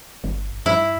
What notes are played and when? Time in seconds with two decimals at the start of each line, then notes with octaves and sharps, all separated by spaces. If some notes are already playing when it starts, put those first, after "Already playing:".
0.24 G1
0.66 G2 E4